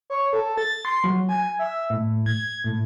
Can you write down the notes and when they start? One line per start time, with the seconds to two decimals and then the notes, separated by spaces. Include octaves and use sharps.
0.10 C#5
0.33 A4
0.57 A6
0.85 C6
1.04 F#3
1.29 G#5
1.59 E5
1.90 A2
2.26 G#6
2.64 A2